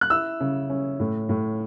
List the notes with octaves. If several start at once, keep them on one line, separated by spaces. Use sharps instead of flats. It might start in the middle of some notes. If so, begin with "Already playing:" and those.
F#6
E4 E6
C#3
C#4
A2
A2